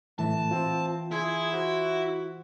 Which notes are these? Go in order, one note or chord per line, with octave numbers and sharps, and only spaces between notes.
A2 E3 A3 A5
C4 F4
E4 G#4 C6 G#6
F#4 C5